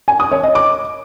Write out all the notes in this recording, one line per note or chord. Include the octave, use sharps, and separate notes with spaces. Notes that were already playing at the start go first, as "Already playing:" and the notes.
G#5
D#6
C#5
D#5
D6